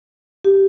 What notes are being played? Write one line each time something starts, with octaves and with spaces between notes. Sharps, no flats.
G4